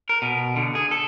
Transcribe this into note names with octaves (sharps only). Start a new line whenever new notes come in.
A#4
B2
D3
G#4
A4